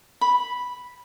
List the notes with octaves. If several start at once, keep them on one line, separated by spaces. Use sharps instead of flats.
B5